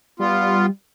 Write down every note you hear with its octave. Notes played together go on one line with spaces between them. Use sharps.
G3 B3 F4